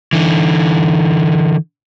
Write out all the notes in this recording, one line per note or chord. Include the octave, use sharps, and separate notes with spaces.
D3 E3